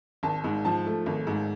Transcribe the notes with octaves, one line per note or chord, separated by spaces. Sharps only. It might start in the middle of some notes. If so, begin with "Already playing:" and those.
G#1 A5
G#2
F3 A5
A3
G#1
G#2